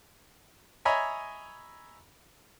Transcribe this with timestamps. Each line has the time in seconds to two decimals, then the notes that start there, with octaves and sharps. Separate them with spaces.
0.85 C#5 D#5 E5 G#5 A#5 B5